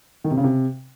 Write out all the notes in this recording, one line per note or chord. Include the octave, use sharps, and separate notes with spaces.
D#3
C3
C#3
C3